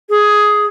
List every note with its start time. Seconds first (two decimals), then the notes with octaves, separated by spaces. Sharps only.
0.10 G#4